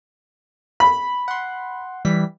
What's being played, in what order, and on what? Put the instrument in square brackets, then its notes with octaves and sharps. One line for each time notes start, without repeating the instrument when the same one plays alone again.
[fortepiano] B5
[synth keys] F#5 C6
E3 G3 B6